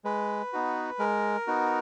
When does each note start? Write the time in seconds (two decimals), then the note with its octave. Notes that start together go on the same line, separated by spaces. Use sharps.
0.05 G#3 B4
0.53 B3 D#4 F#4
0.99 G#3 A#4
1.47 B3 D#4 F#4